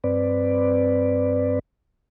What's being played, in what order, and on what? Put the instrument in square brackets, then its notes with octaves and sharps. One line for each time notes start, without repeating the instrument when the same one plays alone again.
[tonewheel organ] G2 C4 B4 D5